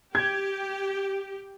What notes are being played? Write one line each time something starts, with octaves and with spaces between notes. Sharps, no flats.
G4 G#6